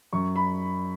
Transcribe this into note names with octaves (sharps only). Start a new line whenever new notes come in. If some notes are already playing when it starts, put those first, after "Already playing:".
F#2 C#6
B5